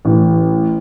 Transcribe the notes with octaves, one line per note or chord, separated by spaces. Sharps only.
A1